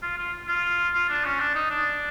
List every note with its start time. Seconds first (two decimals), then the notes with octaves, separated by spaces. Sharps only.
0.03 F4
0.18 F4
0.48 F4
0.94 F4
1.09 D4
1.24 C#4
1.40 D4
1.55 D#4
1.70 D4